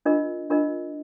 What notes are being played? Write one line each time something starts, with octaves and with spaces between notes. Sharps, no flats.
D4 F4 A#4 D#5
D4 F4 A#4 D#5